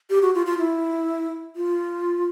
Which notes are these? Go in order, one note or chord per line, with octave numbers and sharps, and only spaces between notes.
G4
F#4
F4
F4
E4
F4